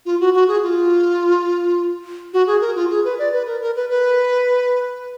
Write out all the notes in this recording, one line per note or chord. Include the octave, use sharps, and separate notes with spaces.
F4
F#4
F#4
G#4
F4
F#4
G#4
A#4
F4
G#4
B4
D5
B4
A#4
A#4
B4
B4